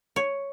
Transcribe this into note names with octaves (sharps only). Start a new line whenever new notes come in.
C#5